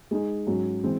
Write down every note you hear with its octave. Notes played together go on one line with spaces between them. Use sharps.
G#3 D#4 G#4
G#2 F#3 C#4 F#4
E3 G#3 C4